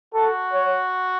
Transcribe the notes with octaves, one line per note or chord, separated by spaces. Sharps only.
F#4 A4
C#5